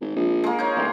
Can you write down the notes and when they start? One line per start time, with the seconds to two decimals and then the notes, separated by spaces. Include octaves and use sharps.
0.01 G#1
0.16 A#1
0.44 G#3 A#3
0.59 D#4 C#5
0.76 D1